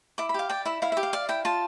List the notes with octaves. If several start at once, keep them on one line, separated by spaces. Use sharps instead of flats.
E4 D6
B5
G4 F5
D5 G5
E4 E5
E4 F5
E5
G4
F5
D5 F5
E4 G5
F4 A5